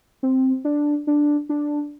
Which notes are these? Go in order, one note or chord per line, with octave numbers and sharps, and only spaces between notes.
C4
D4
D4
D4